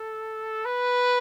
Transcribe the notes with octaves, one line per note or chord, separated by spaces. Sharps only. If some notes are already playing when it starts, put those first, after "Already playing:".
Already playing: A4
B4